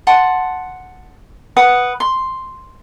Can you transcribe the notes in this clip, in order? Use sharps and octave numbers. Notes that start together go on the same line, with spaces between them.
F#5 A5 C6
B4 F#5 D#6
C6